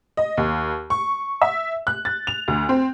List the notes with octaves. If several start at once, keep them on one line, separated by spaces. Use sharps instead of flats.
D#5
D#2
C#6
E5
F#6
A6
F7
D2
C4